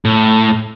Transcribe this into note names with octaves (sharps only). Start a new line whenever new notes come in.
A2